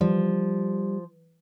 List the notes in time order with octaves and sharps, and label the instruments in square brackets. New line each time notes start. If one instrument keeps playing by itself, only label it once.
[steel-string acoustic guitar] F3 [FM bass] G3